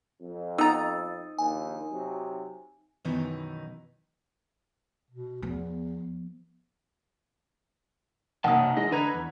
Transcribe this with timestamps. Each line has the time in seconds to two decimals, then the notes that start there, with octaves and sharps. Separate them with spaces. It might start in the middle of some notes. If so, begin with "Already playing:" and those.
0.22 F2
0.58 B3 D#4 A#5 E6 A6
1.38 A#1 D#2 G#5
1.92 C3 F#3
3.05 F#2 B2 D#3 E3 B3 D#4
5.10 B2
5.42 E2 F3 B3
8.44 B1 F#2 C3 A#3 D#5 F#5 A5 D#6
8.77 E3 G#3 D#5
8.91 D3 D4 B4 D#5 A#5 G#6
9.14 E2